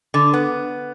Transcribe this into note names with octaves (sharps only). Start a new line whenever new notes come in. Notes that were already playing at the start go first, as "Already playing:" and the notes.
D3
B3